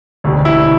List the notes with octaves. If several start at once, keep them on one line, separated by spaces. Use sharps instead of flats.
E1 D2 D3 G3
E4